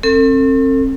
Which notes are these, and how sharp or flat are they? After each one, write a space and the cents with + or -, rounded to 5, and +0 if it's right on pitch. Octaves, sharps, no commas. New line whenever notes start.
C4 +40 A4 +40